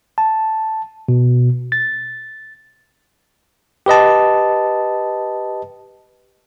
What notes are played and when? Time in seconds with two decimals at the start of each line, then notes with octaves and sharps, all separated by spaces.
0.18 A5
1.08 B2
1.72 A6
3.86 G4 B4 D#5 A5